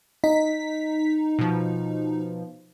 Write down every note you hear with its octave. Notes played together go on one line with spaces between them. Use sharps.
D#4 B6
B2 F3